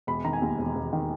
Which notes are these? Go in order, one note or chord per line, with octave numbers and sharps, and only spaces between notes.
E1 B5
D#3 A#5
G#5
D#2
E1
E1
D#3